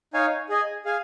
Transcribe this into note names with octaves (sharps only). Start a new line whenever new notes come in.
D#4 C#5 F5 G#5
G#4 D#5 G#5
G#4 F5 G#5